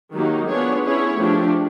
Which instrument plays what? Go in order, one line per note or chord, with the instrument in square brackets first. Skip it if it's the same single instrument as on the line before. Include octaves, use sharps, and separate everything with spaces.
[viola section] D#3 F#3 A#3 D#4 G4
B3 D4 F4 G#4 C#5
C#4 E4 G#4 C#5
F3 A3 D4 G4